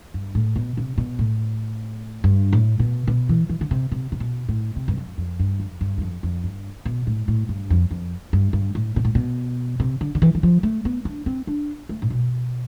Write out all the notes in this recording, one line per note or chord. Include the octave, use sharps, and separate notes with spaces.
G2
A2
B2
C3
B2
A2
G2
A2
B2
B2
E3
E3
D3
C3
C3
C3
B2
A2
C3
G2
F2
F2
G2
F2
G2
E2
F2
F2
G2
B2
A2
A2
G2
F2
F2
G2
G2
A2
B2
A2
B2
C3
D3
D3
E3
E3
F3
A3
B3
D4
C4
D4
A3
A2
B2